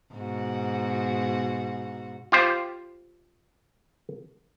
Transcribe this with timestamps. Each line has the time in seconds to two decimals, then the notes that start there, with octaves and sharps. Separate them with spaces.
0.14 G#2 B2 F#4
2.32 F4 G4 C5